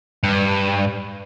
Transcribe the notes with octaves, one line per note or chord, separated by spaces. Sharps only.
G2